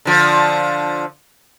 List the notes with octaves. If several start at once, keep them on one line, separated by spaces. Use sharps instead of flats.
D3 F3